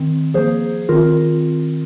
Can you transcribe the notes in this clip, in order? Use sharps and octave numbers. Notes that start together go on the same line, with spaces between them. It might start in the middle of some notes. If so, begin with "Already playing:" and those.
Already playing: D#3 C4
F3 A#3 G#4 C5
D#3 C4 F4 A#4